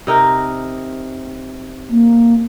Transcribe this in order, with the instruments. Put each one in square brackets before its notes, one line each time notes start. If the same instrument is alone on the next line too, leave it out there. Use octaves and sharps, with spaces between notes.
[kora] C3 D#4 A#4
[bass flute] A#3